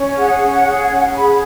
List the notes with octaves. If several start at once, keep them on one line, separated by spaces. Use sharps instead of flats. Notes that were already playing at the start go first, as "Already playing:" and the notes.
Already playing: C#4
G#4 F#5
C#4
G#4
C#4
G#4 B5